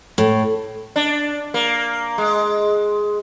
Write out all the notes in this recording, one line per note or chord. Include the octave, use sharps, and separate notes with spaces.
A2
D4
A#3
G#3